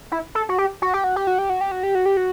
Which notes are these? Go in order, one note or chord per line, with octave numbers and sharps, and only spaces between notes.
E4
A4
F#4
G4
F#4
G4
F#4
G4
F#4
G4
F#4
G4
F#4
G4
F#4
G4
F#4